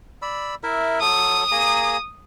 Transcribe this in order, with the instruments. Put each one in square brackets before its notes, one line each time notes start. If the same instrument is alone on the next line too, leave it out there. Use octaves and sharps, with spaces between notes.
[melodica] D5 B5 E6
E4 A#4 E5
[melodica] F#3 A4 [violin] D#6
[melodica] A#3 G#4 A#5